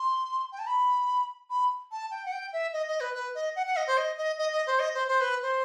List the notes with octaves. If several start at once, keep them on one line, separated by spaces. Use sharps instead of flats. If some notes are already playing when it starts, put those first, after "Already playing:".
Already playing: C6
G5
A5
B5
B5
A5
G5
F#5
G5
E5
D#5
D#5
B4
B4
D#5
F#5
F#5
D#5
C5
D#5
D#5
D#5
D#5
C5
D#5
C5
C5
B4
C5